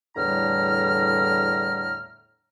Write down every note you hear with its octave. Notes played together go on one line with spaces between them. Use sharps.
E2 A2 D3 G3 A#5 F6